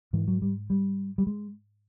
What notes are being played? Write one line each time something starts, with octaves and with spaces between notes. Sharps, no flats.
G#2 E3
F#3
G3
G3
G3
G#3